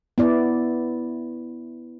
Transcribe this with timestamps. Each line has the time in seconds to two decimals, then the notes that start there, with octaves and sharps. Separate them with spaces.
0.18 B3 E4 D5